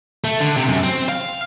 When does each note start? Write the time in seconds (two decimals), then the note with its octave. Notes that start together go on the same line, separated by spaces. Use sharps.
0.24 A3
0.40 D3
0.57 C3
0.69 F#2
0.83 C4
1.09 F5